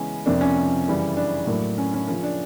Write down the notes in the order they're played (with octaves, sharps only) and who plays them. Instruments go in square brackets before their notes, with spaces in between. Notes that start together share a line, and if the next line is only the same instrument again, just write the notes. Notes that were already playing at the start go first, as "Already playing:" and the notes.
Already playing: [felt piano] C#3 E3 G#3 B3 C#4
F2 C3 F3 A#3 D4
C#4
F#2 C#3 E3 G3
D4
A2 F#3 A#3
C#4
C#4
C#3 F3 A#3 C#4
D4